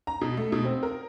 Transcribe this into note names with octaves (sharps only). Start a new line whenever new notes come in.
A#5
B2
A3
B2
C4
A#4